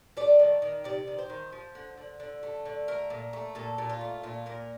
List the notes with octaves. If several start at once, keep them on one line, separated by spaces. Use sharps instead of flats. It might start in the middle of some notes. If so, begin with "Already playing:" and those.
A3 D5
D#3
D#3
C3 D5
D#3
C5
D#3
F3
D3
D3
D3
A3
D3
A3 A#4
A#2
A3
A#2 A4
A#2
F4
A3
A#2 F4
A#2 A#4